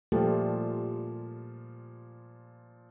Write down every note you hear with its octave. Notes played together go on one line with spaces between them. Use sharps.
A#2 F3 G3 A3 G4